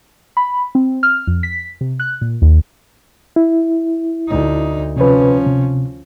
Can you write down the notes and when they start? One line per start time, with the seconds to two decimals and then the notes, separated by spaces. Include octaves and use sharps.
0.37 B5
0.75 C4
1.03 F6
1.27 F2
1.43 B6
1.81 C3
2.00 F#6
2.21 A#2
2.42 D#2
3.36 E4
4.28 D2 D#4
4.97 C3 F3 C#4 B4
5.46 C3